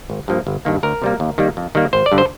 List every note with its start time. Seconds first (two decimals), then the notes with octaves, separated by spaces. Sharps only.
0.10 G#1
0.28 G2 F3 A#3
0.47 G1
0.65 G2 D#3 A#3
0.83 D2 A#4
1.02 C3 G3 A#3
1.20 D#2
1.38 D#3 G3 A#3
1.57 F2
1.75 D#3 G3 A#3
1.93 G#1 C5
2.06 D5
2.12 G2 D3
2.18 C5